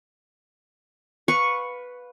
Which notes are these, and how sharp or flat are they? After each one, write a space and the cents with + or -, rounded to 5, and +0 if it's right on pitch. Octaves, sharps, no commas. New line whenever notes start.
B4 +0 F5 +30 C#6 +0